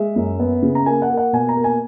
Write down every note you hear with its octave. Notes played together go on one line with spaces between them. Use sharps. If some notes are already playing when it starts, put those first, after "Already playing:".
Already playing: G#3 E5
F#2
B3
C#3
A#5
A#3 G#5
F#5
A#3
F#5
B2 G#5
A#5
A#3
G#5